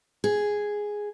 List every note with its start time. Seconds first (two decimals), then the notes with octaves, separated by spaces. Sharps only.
0.24 G#4